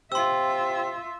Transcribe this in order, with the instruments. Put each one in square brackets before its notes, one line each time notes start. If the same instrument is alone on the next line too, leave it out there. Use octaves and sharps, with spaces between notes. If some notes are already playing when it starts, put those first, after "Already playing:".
[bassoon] C3 [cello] F4 E5 [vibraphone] G5 [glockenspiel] C6 E6